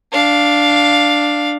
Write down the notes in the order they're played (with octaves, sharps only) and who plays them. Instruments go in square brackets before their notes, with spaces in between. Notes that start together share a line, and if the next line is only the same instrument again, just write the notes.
[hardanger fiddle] D4 F5